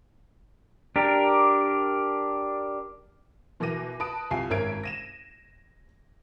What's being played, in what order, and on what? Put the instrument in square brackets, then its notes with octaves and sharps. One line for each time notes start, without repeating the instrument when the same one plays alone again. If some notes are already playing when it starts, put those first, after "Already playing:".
[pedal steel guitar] D4 G4 A#4
[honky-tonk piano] B2 E3 A#4 D6 A#6 D#7
B4 A5 D#6 D7
C2 F4 G#5 C7
G#1 C#4 A#4 E5 G#6 D7
A#6 D#7 E7